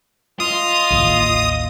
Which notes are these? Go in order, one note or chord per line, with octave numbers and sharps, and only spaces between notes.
F4 D#5 D#6
A1 D#2